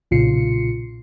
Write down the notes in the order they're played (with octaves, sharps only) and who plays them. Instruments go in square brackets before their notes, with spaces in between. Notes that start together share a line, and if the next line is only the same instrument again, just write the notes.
[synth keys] B1 A#2 C#3 F4 C7 C#7